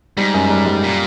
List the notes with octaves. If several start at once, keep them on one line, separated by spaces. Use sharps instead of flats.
G#2 G3
F#2
G3
G3
A#2